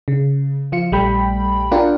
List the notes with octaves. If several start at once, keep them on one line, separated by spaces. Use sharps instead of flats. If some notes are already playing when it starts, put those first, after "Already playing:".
C#3
F3 F4 C#7
A#1 G3 A3 G5 B5
D4 F4 A#4 D5 F#5 G5